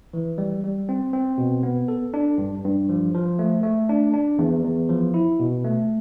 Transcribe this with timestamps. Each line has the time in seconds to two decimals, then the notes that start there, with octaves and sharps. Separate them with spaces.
0.13 E3
0.38 G3
0.64 G3
0.89 C4
1.13 C4
1.38 B2
1.63 B3
1.88 A4
2.14 D4
2.38 G2
2.64 G2
2.89 F3
3.14 F3
3.39 A3
3.63 A3
3.89 D4
4.13 D4
4.38 E2
4.63 E2
4.89 F3
5.14 E4
5.39 B2
5.64 A3